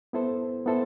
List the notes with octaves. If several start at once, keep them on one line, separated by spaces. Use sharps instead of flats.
B3 E4 A4 C5
B3 E4 A4 C5